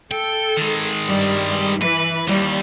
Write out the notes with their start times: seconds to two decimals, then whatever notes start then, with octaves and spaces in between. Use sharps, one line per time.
0.11 A4 G5
0.57 D#3 G#3
1.07 G2 G3
1.82 E3 B4
2.27 D#2 G3